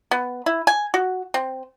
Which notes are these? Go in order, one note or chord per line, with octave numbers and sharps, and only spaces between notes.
B3
E4
G#5
F#4
C4